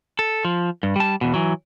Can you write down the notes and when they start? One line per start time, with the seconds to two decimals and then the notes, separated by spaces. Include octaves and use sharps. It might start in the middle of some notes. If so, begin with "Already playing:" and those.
0.19 A4
0.45 F3
0.83 G2
0.96 G3 A5
1.21 E2 B2
1.34 E3 F#3